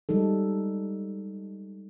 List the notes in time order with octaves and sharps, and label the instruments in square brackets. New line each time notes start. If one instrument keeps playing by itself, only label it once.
[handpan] G3 G#3 D#4 A4